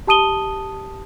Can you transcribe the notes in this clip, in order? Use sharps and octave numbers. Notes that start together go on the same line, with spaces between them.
G4 A5 D#6 D#7 G7